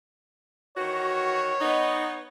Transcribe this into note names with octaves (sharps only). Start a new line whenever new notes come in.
D#3 E3 F#4 C#5
B3 D#4